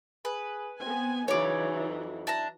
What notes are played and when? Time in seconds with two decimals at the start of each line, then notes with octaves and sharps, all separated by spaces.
0.25 G#4 B4
0.82 B3 C4 G#5
1.28 C#3 E3 F#3 D#4 C#5 D5
1.88 F2
2.27 D4 E4 A5 A#5